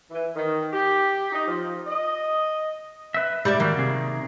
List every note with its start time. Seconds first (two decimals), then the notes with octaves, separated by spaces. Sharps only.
0.11 E3
0.35 D#3
0.72 G4
1.32 D#4
1.47 F3
1.87 D#5
3.14 B4 E5
3.45 G#2 G3 D5 E5
3.60 D#3 G3 A#3 F#4
3.77 C3 D#3 G#4